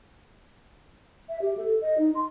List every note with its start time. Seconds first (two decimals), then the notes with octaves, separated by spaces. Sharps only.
1.29 E5
1.42 G4
1.58 A4
1.81 D#5
1.98 D#4
2.15 C6